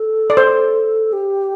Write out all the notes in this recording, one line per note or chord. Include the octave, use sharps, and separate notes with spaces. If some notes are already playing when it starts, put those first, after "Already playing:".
Already playing: A4
D5
C5
G4